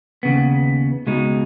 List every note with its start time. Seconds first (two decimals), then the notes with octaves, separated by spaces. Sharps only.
0.23 D#2 C#3 B3
1.07 C#2 B2 G#3 D#4